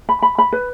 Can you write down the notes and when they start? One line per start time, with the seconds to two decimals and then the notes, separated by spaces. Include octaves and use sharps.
0.09 B5
0.22 B5
0.38 B5
0.52 B4